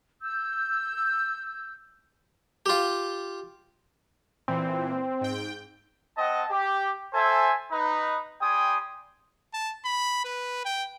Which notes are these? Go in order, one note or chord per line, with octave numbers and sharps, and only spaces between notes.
E6 G6
F4 G4
A#2 E3 C4
G#2 G5
C4 D#5 F#5 A5
G4
A4 C5 E5 G#5
D#4 B4
G3 G5 G#5 C6 D#6
A5
B5
B4
G5